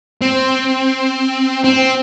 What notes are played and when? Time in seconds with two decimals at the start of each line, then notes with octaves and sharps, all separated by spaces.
0.21 C4
1.64 C4